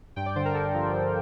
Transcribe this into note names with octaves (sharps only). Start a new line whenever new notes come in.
G2 G5
D5
D3 C5
A#4
G2 A4
F3
G2